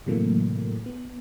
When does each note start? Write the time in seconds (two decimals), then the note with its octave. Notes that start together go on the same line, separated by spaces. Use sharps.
0.06 A2 C3 E3 F#3 A3 A#3
0.86 B3